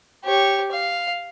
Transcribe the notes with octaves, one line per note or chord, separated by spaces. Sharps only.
G4 C#5
F5